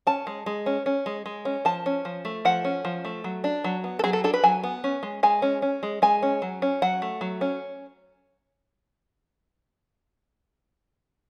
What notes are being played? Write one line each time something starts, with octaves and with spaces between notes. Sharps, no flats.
C#4 A5
G#3
G#3
C#4
C#4
G#3
G#3
C#4
F3 A5
C#4
F3
A3
F3 F#5
C#4
F3
A3
F#3
D4
F#3
B3
A4
F#3 G#4
A4
D4 A4
B4
F#3 G#5
B3
C#4
G#3
G#3 G#5
C#4
C#4
G#3
G#3 G#5
C#4
F#3
C#4
F#3 F#5
A3
F#3
C#4